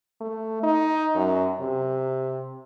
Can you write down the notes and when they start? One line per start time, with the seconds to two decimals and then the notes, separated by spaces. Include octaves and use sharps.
0.21 A3
0.63 D#4
1.15 F#2
1.61 C3